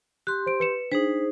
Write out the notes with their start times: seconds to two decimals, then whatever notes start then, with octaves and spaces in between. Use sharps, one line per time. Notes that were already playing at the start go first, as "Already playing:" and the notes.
0.27 G4 C6 F#6
0.46 C5 D7
0.60 B4 C#7 E7
0.91 D4 D#4 G#4 C5 B6